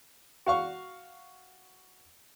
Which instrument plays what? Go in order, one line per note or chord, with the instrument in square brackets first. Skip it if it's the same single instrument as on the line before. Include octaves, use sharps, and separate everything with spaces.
[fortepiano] F#4 F5 C#6